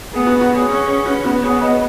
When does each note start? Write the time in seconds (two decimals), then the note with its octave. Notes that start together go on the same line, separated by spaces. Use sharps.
0.13 B3 G#4
0.27 F#4 B4
0.41 F#4 B4
0.54 G#4 C#5
0.68 C#4 G#4 C#5
0.87 G#4 C#5
1.06 F#4 B4
1.24 B3 F#4 B4
1.43 G#4 C#5
1.61 B4 D#5